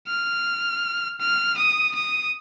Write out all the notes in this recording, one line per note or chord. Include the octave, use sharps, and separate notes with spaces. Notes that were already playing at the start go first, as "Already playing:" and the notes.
F6
F6
D#6
D#6